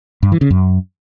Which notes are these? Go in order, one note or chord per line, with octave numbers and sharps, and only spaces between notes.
G2
E3
C#3
F#2